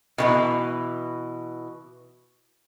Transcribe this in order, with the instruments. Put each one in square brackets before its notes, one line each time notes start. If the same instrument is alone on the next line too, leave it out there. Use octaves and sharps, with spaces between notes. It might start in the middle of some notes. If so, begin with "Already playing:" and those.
[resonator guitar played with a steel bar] B2 D#3 E3